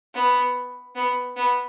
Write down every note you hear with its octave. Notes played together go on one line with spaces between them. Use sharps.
B3
B3
B3